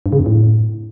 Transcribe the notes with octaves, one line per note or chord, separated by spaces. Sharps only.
G2
C#3
F2
A2